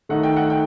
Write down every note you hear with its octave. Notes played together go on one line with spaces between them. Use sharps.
D#3 A3 D#4 F#5
G5
F#5
G5